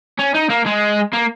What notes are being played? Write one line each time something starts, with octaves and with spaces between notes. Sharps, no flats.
C#4
D#4
A#3
G#3
A#3